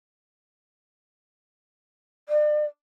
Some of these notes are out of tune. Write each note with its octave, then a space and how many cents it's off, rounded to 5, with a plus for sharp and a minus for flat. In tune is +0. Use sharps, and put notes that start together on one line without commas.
D5 +40